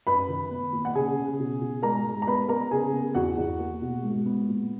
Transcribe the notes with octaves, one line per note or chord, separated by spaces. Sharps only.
F#2 B4 B5
D#3
B3
A#2
F#5
C#3 G#4 G#5
C#3
B2
B2
G#2 A#4 A#5
G#2
A#5
B3 B4 B5
B3 A#4 A#5
C#3 G#4 G#5
B3
E2 F#4 F#5
E2
A#3
B2
G#2
B3
A#2